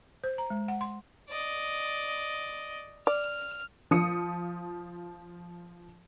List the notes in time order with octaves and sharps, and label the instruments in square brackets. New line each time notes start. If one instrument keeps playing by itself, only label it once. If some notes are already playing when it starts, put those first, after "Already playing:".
[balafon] C5
A#5
G#3
F#5
C6
[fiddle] D5 D#5
[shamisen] D5 [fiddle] F6
[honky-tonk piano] F3 D#6 C#7